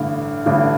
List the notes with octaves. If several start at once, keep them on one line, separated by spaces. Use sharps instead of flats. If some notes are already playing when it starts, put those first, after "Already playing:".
Already playing: A1 G2 D3
A1 G2 D3